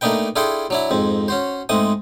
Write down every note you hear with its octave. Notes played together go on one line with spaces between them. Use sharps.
A3 A#3 D4 D#4 B4 G5
D4 E4 F4 G#4 A4 G5
F#3 D4 E4
F2 G#2 C4
C#4 F#4 C5
G#2 G#3 A3 C4 D#6